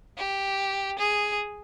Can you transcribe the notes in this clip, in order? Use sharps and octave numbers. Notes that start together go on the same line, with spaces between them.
G4
G#4